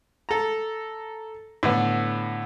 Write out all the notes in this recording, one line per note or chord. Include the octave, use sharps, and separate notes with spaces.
A4 A#5
A2 D3 B3